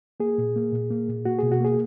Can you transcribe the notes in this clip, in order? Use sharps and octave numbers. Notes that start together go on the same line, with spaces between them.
A#3 G#4
A#2
A#3
A#2
A#3
A#2
A#3 F#4
B2 G#4
F#4
A#3 G#4